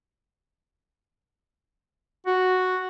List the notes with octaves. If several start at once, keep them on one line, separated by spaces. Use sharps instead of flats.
F#4